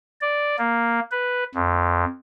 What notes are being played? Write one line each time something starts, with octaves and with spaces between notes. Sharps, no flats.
D5
A#3
B4
F2